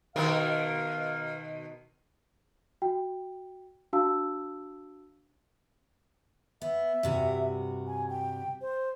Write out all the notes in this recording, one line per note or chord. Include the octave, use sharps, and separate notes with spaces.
B2 D#3 A#4 F5
F#4 G5
D4 F#4 F5 A5 E6
B3 E5
G2 C3 F#4
G#5
G5
C5